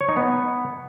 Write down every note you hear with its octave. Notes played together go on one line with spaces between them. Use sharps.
C#5
D#4
B3